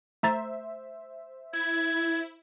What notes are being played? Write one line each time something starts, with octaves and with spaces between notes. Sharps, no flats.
A3 C5 E5 A#5 A6
E4 G#6